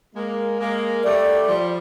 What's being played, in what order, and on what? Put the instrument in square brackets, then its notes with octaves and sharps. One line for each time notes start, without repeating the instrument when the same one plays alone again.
[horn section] G#3 A#3
G#3 A#3
[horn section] G3 A3 [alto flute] D5
[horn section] F3 G3